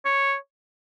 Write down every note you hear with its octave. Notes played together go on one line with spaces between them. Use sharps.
C#5